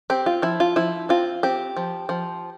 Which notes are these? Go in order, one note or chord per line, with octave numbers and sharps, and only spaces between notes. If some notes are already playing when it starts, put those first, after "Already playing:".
C4 G4
F4
F3 E4
F4
F3 E4
C4 F4
C4 G4
F3
F3